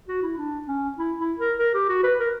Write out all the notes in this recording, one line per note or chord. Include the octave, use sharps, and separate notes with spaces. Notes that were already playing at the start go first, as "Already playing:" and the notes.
F#4
E4
D4
C#4
E4
E4
A#4
A#4
G4
F#4
B4
A#4